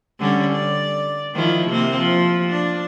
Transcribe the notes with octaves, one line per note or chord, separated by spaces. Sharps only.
D3 G3 C#4
D5
D#3 F3 E4
C3 A#3 C4
F3
D4